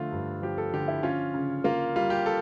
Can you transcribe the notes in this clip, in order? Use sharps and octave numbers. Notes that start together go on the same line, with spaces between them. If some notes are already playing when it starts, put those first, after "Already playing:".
Already playing: D3 F3 A3 F4
G2
F3 G4
A4
D3 G4
E4
C#4 F4
C#3
A#3 F4
G3 F4
G4
A4